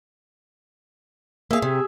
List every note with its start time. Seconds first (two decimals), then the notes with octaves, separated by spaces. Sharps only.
1.51 A#3 G#4 E5 F5
1.62 C3